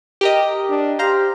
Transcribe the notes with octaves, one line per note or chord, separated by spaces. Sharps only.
G4 A#4 D#5
D4
G4 C5 F5 A#5